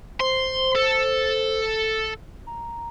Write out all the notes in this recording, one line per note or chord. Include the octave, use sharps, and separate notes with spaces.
C5 C6
A4
A#5